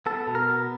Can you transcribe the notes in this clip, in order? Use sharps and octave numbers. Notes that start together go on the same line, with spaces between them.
B3 A4
B2
A#4
B3